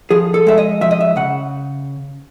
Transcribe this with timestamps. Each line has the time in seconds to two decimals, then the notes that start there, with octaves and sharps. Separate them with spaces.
0.11 F3 G#4
0.34 A4
0.47 G#3 E5
0.58 D#5
0.81 F3 E5
0.91 D#5
1.01 E5
1.16 C#3 F#5